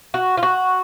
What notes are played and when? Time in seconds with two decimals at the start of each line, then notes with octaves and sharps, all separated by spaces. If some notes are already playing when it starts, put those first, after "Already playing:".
0.14 F#4
0.37 F4
0.43 F#4